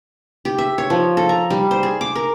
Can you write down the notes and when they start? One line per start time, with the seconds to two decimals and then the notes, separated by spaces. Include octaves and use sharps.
0.45 G4
0.58 E5
0.78 C#5
0.90 F3
1.17 A4
1.29 A#5
1.50 G3
1.71 C5
1.83 G#4
2.01 D6
2.15 A#4